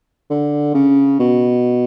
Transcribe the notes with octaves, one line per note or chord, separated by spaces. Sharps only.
D3
C#3
B2